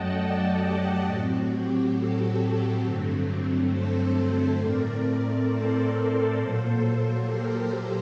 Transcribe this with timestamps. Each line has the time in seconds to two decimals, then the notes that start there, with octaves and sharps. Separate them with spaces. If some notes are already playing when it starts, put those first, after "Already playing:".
Already playing: F#2 F#3 A3 D#5 F#5 G5 A5
0.16 D5 F#5
0.60 G4
1.05 A2 F#3 C4 F#4
1.49 G4
1.93 F#4 A4
2.82 G2 D3 F#3 A3 C4
3.70 A4 C5
4.14 A4 C5
4.59 A2 A3 C4 A#4 D5
5.03 A#4 D5
5.47 A4 C5
6.36 A#2 F#3 A#3
7.24 G4 A#4